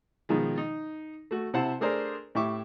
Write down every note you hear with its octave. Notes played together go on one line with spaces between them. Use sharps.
B2 D#3 F3 G#3
D#4
A3 F#4
C3 E4 C5 F#5 A5
A3 D4 G#4 A#4 C5 D5
A2 E4 G4 E5 C#6 D6